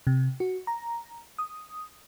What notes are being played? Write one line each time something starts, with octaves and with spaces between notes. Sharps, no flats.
C3
F#4
A#5
D#6